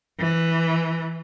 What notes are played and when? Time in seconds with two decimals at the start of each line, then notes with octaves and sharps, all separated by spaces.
0.19 E3